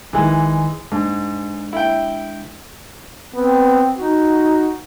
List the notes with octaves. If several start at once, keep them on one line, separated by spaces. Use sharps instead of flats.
A#1 D#3 E3 G#3
G#2 G#3 D4
E4 G5
B3 C4
D#4 F#4